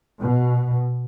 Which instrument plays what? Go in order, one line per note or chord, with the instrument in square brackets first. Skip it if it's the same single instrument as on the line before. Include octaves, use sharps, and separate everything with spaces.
[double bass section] B2